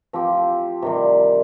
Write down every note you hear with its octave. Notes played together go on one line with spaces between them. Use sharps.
F3 C4 G4
C3 D#3 G3